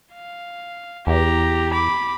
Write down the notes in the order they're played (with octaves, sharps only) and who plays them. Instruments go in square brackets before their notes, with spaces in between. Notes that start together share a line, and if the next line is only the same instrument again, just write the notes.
[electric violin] F5
[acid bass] E2 [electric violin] G4 A#5
[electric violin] B5 D6